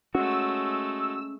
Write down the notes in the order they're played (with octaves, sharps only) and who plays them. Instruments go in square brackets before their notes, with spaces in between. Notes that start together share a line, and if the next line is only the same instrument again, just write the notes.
[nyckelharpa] G#3 A3 [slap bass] C#4 [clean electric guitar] F#4 [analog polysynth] E6